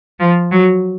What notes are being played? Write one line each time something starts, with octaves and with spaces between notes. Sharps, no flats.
F3
F#3